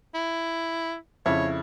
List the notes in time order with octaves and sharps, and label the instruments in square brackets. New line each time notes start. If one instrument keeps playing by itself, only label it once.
[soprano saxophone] E4
[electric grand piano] F2 C#3 [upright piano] E4 [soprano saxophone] C#5